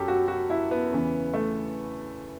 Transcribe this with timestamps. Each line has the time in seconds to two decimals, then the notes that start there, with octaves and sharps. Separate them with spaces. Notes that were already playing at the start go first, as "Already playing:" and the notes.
Already playing: F#2 F#3 G4 A4
0.08 F#4
0.28 F#4
0.50 E4
0.71 B3
0.92 E2 C#3 E3
1.34 A3